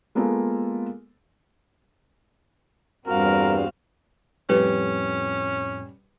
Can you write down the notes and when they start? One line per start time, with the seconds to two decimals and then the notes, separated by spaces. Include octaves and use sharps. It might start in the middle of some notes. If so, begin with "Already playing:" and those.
0.15 G#3 A#3 B3 F4 A4
3.07 E2 G2 G3 C4 F#4 A#4 F5
4.49 F2 A2 G3 C#4 B4